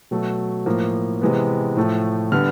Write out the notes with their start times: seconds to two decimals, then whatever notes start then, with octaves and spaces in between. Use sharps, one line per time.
0.11 B2 F#3 A3
0.66 A2 F3 A#3
1.22 C3 E3 G#3 B3
1.77 A2 F3 A3
2.32 D3 G3 B3 F6